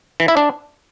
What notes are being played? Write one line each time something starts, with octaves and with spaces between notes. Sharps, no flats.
E3
E4
D4